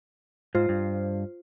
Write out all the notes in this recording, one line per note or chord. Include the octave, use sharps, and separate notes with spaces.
G#2 F4 C5
G2